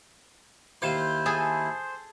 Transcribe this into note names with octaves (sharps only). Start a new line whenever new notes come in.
D#2 E4 F4 C5 C6
G#4 A4 G#5